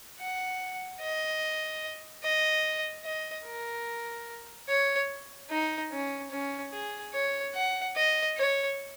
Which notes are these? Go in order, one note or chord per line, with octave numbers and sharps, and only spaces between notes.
F#5
D#5
D#5
D#5
A#4
C#5
D#4
C#4
C#4
G#4
C#5
F#5
D#5
C#5